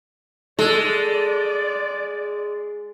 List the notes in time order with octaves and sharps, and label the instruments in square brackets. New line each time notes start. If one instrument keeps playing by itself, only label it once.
[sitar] G#3 [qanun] A4 [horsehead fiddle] D5